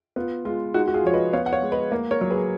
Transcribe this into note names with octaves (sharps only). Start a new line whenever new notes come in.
B3 F4
G#3 F4
G#3 D#4 F#4
F#4
F4 G#4
F3 C#5
B4 D#5
B3 C#5 F5
F#5
C#5 F5
G#3
B4 D#5
A#3
A#4 C#5
F#3 C#5
G#4 B4